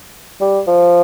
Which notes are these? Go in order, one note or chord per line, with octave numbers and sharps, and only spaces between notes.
G3
F3